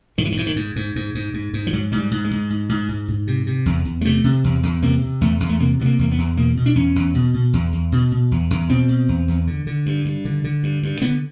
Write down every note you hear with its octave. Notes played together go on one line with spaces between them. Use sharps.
G#2 D#3
E3
D#3
G#2 E3
D#3
G#2
G#2
G#2
G#2
G#2
G#2
F3
G#2 F#3
G#2 G#3
G3
G#2
G#3
G#2
G#2
G#2
G#2
G#2
C3
C3
E2
E2
G#3
C3 A3
C3
E2
E2
C3 A#3
C3
E2 A3
E2
A3
C3 A#3
C3 B3
A#3
E2 A#3
B3
E2
B2 A#3
B2
D4
E2 C#4
E2
B2
B2
E2
E2
B2
B2
E2
E2
B2 C4
B2
E2
E2
D3
D3
G2
G2
D3
D3
G2
G2
D3 B3